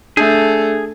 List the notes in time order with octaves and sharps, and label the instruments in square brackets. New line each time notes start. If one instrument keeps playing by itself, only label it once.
[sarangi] A3 [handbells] D4 [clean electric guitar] G#4